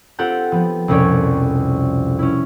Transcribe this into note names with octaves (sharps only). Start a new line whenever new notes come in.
C4 F4 G4 A4 F#5 G5
F3 B3
C2 F2 B2 C#4 C#5 D5
C#4 E4